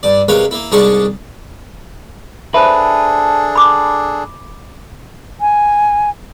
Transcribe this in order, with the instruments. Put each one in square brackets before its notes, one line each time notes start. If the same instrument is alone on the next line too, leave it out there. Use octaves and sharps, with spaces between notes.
[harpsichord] G2 D5
C3 G#3 A#4 B4 C#5 F5
A#3 E4
C2 G#2 D4 G#4 A5 C#6
[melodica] D4 G#4 A4 [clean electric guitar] B4 [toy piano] C5 E5
[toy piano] B5 D6
[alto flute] G#5